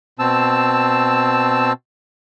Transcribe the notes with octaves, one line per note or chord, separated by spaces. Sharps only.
B2 C4 A5 E6